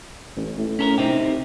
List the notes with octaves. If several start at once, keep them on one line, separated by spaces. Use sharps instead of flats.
A1
A2
C#4 A4 A#4
C3 C4 D#4 G4